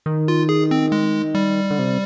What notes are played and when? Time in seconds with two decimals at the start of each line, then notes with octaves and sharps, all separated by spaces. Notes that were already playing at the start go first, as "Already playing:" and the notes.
0.06 D#3
0.28 F4
0.49 G#4
0.71 C4
0.92 G#3
1.35 G3
1.71 D3
1.79 C3